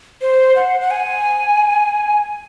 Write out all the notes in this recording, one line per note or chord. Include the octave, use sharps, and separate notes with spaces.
C5
F#5
F#5
G#5